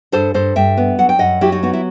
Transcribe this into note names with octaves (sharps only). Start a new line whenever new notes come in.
G2 A4 C5
G2 A4 C5
G2 E5 G5
B3
F#3 F#5
G5
F#2 D#5 F#5
F#3 E4 G4
D#4 F#4
B3 D#4 F#4
E4